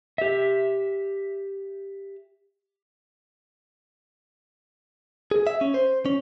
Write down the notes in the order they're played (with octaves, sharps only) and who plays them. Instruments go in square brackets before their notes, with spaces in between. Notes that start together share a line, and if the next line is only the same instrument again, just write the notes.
[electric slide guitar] G4 E5
[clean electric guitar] G#4
E5
C#4
C5
C#4